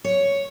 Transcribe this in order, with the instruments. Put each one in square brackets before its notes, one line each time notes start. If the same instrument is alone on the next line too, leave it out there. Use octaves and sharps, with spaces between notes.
[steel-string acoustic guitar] C#5